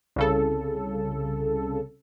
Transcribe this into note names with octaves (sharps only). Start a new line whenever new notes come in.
C2 C#3 A4